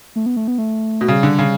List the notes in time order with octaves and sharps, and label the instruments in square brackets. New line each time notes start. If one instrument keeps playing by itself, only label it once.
[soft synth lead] A3
B3
A3
B3
A3
[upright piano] B2
[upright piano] C#3 [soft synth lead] G3
[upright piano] D3
C#3